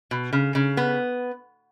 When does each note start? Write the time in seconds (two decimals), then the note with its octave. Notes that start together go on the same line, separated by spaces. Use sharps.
0.11 B2
0.33 C#3
0.55 C#3
0.77 B3